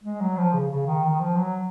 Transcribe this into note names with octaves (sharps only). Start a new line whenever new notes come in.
G#3
F#3
F3
C#3
C#3
D#3
D#3
F3
F#3